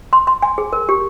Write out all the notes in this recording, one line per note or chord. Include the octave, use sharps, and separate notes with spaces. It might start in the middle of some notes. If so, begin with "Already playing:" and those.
C6
C6
G#5
G#4
A#4
G4